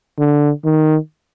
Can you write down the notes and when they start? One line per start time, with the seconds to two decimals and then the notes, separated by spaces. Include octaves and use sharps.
0.19 D3
0.65 D#3